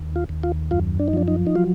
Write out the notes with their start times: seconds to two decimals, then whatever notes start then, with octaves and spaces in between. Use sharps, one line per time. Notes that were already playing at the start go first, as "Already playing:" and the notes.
Already playing: D#2
0.16 F4
0.29 D#2
0.43 F4
0.71 F#2 F4
0.99 D4
1.08 D#4
1.13 F3 D4
1.28 D#4
1.47 D#4
1.55 F#3 F4